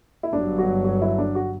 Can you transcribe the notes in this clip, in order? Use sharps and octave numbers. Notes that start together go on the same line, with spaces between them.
E4
G1 G2 F#3 D4
F#4
F#4
E4
D4
F#4